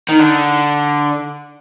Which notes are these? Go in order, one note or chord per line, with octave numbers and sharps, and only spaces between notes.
D#3
D3